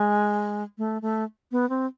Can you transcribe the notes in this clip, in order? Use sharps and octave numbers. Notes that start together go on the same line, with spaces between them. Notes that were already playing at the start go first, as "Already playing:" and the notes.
Already playing: G#3
A3
A3
B3
C4